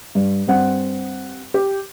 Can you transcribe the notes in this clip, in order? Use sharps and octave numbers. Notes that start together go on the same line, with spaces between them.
G2
G2 C4 F#5
G4